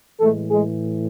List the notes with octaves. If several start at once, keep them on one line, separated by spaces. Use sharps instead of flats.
A2 E3 G#3 A3 A4
G#3 G#4